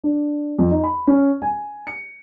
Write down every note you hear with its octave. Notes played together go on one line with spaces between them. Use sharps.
D4
F2
D#4
B5
C#4
G#5
C#7